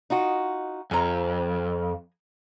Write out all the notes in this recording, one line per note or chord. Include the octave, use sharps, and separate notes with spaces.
D#4 F4 F#4
F2 G#5 A#5